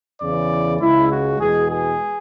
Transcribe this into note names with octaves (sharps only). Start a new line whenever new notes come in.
E2 C#3 E3 D5
C#2 C#3 G#3 E4
F#4
E2 B2 G#3 B3 G#4
G#4